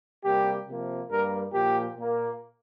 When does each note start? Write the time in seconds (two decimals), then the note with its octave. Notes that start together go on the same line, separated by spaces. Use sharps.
0.25 C3 G3 A#3 G4
0.68 C3 F3 A#3
1.10 G2 G3 A#3 A#4
1.52 A#2 F3 A#3 G4
1.96 A#2 A#3